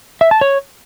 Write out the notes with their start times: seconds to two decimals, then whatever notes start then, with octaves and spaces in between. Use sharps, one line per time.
0.21 E5
0.31 A5
0.41 C#5